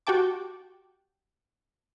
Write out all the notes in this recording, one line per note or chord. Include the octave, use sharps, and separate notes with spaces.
F#4 G4 G5 A5 D6